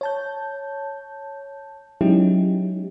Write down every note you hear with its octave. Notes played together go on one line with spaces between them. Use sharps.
C#5 A5 G6
F#3 G#3 C#4 D#4 E4 G4